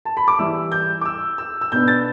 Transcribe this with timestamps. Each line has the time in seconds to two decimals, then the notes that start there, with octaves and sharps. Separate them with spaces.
0.05 A5
0.17 B5
0.28 D6
0.39 E3 G3 E4 E6
0.72 G6
1.01 D6
1.05 E6
1.38 E6
1.61 E6
1.72 B2 B3 D4 G6
1.88 A6